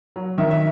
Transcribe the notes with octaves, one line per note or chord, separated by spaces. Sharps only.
F#3
D#3 E5
E5